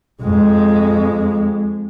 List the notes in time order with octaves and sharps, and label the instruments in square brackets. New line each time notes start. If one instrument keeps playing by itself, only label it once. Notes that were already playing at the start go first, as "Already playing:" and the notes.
[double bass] F2 G#3